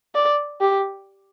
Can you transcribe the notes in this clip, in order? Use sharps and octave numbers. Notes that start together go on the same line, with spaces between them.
D5
G4